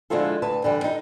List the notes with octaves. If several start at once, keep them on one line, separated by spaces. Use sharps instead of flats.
D3 F3 G#3 E4 F4 A4
D2 B4 A5
D3 E3 G3
D#4